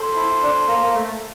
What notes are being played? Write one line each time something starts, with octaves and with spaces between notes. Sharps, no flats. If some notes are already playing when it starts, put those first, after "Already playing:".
Already playing: A4 C5
E4
D4
A#3
A#3
A3